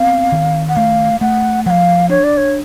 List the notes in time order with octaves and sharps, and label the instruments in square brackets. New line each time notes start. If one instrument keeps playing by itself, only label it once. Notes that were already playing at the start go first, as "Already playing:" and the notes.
Already playing: [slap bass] B3 C4 [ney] F5
[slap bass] D#3
[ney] F#5
[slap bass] A3 [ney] F5
[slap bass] A3 [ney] F#5
[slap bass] F3 [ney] F#5
[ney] F5
[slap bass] D4 [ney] C#5
[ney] D5
C#5